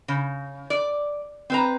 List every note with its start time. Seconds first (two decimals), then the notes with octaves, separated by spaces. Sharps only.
0.08 C#3
0.70 D5
1.50 C4 B4 A#5